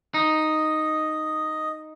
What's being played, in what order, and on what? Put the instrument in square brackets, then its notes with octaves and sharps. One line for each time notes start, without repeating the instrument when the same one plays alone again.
[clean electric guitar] D#4 [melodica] D#5